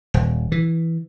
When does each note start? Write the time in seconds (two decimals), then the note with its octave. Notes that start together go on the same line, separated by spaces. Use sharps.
0.14 D#1
0.52 E3